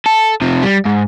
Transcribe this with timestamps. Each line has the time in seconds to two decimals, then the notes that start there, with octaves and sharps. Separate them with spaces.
0.06 A4
0.41 C3 F3
0.63 G3
0.85 G#2